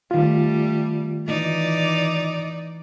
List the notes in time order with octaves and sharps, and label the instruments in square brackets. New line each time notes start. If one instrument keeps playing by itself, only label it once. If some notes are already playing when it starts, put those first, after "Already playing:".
[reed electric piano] D#3 F4 [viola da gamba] G3 A3
[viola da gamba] E3 D#4 D5